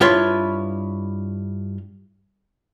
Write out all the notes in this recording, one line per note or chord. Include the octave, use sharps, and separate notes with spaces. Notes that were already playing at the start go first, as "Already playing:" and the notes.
G2 E4 F4 B4 C#5 C6